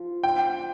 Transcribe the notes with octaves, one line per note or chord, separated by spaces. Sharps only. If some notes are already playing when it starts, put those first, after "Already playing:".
Already playing: F3
G5